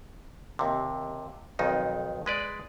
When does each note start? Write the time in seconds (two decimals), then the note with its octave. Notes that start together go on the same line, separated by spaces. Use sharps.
0.59 D#2 C3
1.59 B1 F2 D#3 D#4
2.26 G#3 B4 D5